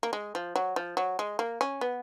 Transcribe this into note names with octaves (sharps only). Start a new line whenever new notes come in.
A#3
G#3
F3
F#3
F3
F#3
G#3
A#3
C#4
B3